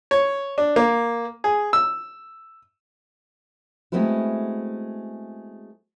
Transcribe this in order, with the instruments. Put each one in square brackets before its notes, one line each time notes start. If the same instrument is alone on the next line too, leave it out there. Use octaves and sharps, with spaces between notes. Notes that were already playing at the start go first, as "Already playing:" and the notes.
[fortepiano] C#5
D4
A#3
G#4
E6
[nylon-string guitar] G#3 A3 B3 C4 E4 F#4